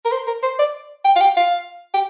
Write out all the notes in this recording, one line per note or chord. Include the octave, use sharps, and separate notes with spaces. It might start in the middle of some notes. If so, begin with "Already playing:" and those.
A#4
C5
A#4
C5
D5
G5
F5
G5
F5
G5